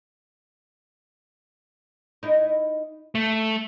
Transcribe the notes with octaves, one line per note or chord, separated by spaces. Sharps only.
D#4 E4
A3